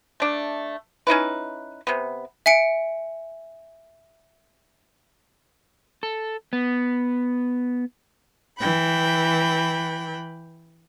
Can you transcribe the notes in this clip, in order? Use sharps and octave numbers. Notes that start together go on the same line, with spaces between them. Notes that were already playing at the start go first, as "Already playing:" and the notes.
A3 D4
C#4 D#4 E4 B4
C3 B3
E5 G#5 C#7 D7
A4
B3
E3 G5 B5